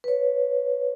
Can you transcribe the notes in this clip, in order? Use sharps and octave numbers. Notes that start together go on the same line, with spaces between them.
B4 C#5